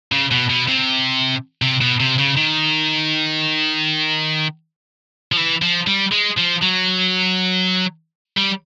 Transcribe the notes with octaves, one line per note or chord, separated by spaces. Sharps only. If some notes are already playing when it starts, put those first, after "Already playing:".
C#3
B2
B2
C3
C3
B2
C3
C#3
D#3
F3
E3
F3
G3
G#3
F3
F#3
G3